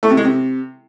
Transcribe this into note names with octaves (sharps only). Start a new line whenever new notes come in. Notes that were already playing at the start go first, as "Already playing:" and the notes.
A3
C3
G#3
C3